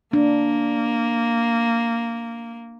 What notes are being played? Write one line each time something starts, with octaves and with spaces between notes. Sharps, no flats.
A#3 D4